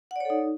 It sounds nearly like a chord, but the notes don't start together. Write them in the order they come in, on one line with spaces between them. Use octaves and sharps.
F#5 D5 C#5 A4 D#4